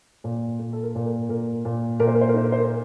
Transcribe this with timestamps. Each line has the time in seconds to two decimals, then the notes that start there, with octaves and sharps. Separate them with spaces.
0.24 A#2
0.59 A#2
0.73 A4
0.83 A#4
0.95 A#2
1.06 A#4
1.29 A#2 A#4
1.65 A#2
1.99 A#2 A#4
2.08 C5
2.15 A#4
2.21 C5
2.29 A#4
2.34 D#4 C5
2.44 A#4
2.52 C5
2.60 A#4